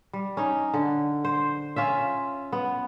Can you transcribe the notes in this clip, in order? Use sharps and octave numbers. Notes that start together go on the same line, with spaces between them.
G3
C#4 D#4
D3
C5
C#4 F4 E5
B3